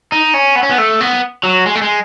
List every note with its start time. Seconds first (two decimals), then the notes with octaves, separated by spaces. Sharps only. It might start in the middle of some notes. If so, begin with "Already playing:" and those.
0.12 D#4
0.34 C#4
0.56 B3
0.63 C#4
0.70 B3
0.78 A3
1.01 B3
1.43 F#3
1.66 G#3
1.75 A3
1.82 G#3